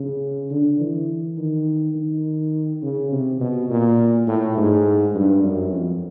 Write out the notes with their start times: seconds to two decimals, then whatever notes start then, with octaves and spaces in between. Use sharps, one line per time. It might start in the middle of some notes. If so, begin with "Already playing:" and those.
Already playing: C#3
0.51 D3
0.80 E3
1.38 D#3
1.96 D#3
2.83 C#3
3.12 C3
3.41 B2
3.70 A#2
4.27 A2
4.57 G#2
5.15 G2
5.43 F#2
5.73 F2